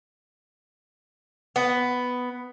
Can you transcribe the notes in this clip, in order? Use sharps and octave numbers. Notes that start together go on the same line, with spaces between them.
B3